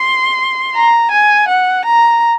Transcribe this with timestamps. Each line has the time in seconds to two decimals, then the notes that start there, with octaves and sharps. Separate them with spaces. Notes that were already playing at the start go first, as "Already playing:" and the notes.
Already playing: C6
0.75 A#5
1.11 G#5
1.49 F#5
1.85 A#5